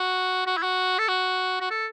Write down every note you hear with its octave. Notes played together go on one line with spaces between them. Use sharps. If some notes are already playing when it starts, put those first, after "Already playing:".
Already playing: F#4
F#4
E4
F#4
A4
F#4
F#4
A4